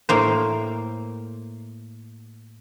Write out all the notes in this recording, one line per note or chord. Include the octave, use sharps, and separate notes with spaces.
A2 A#3 C5